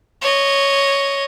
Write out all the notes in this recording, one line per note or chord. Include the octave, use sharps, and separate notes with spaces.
C#5 D#5